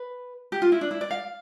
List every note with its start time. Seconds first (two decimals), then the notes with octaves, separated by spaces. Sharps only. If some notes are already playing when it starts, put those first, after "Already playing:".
Already playing: B4
0.52 G4
0.62 F4
0.72 E4
0.81 D4
0.91 E4
1.01 D5
1.11 F5